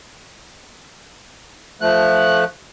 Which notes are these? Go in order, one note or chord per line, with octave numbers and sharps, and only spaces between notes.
F3 A3 F#6